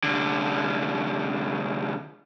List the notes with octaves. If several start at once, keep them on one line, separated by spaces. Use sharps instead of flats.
C2 D3